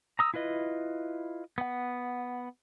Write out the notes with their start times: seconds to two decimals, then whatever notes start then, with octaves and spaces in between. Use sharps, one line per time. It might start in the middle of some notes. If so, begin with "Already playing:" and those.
0.19 A#5 D#6 E6
0.34 E4 F4 B4 D#5
1.58 B3 F#5